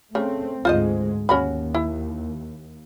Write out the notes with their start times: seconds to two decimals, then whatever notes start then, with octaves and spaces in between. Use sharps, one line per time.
0.15 C#3 A3 C4
0.65 D2 G#2 G#3 F4 C5 D#5
1.29 D#2 C#4 F#4 B5
1.75 E4